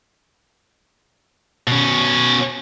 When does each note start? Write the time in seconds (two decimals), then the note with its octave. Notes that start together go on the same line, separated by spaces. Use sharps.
1.67 B2 C#4